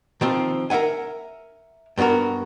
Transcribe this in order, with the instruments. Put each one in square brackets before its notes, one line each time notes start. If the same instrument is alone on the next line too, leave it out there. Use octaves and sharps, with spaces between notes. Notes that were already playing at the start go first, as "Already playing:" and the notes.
[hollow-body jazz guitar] D#3 F3 C4
A#4 B4 E5 F#5 G#5
G2 B3 D#4 F#4 A#4